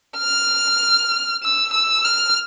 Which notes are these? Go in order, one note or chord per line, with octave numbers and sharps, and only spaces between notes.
F6
E6
E6
F6